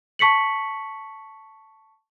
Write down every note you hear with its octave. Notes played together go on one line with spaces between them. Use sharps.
A5 C#6 B6 C#7 F#7